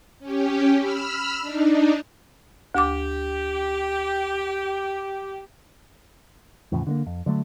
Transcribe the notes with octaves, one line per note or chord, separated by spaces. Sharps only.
C#4 G4
B5 E6 F6
D4 D#4
D2 G4 D6
E2 A2 C#3 F3
D3 A3 A#3
F2
D3 F#3 A3